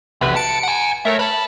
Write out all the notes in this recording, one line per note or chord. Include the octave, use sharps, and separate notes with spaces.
B1 E2 C3 B4
D3 A5 C#7 D7
F#5 G#5
B1 A3 A#4 C#5 E5
B4 A5 B5